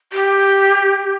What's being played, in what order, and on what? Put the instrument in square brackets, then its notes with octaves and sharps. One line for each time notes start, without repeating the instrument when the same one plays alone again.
[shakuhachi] G4